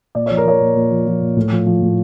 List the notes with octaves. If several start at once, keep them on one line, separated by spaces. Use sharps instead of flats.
A#2 D5
F3 C#5
A#4
F3 C#5
A#2
A#2
F3
F3
A#2
A2
F3
F3
A2